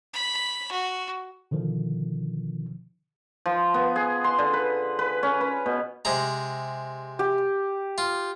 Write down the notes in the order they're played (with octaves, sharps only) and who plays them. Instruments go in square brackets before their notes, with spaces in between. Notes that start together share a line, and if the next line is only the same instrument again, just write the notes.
[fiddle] B5
F#4
[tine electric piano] B2 D3 D#3 F3
[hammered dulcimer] F3
B3
G#4
C6
D3
B4
B4
C#4
B4
B2
[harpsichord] C3 G#3 A#5
[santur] G4
[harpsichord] F4